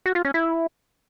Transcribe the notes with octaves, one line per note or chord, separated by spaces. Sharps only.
F#4
F4
C#4
E4